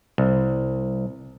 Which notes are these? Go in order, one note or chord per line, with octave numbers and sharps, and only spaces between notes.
C2